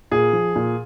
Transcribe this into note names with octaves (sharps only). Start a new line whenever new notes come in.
A#2 G#4
F3
A#2